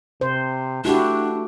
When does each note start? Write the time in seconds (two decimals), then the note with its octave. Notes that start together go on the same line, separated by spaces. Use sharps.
0.21 C3 C5
0.85 A3 D4 E4 F#4 G4